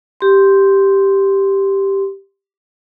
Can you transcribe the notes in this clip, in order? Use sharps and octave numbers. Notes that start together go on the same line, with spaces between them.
G4 C6